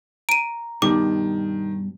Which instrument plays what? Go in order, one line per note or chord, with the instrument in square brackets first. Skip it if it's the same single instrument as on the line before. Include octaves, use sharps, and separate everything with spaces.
[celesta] A#5 [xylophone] D7 D#7
[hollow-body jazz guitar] G2 B2 [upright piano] D#3 [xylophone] D6